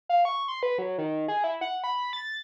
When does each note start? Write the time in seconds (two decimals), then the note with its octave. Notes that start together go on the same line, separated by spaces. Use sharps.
0.09 F5
0.25 C#6
0.48 C6
0.63 B4
0.78 F#3
0.98 D#3
1.28 G#4
1.44 E4
1.61 F#5
1.84 B5
2.13 A6